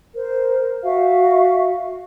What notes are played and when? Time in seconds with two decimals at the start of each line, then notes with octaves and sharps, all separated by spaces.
0.15 A#4 C5
0.83 F#4 E5 F5